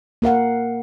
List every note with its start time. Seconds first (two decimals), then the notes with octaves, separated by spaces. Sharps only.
0.22 A#3 A#4 F5 F#5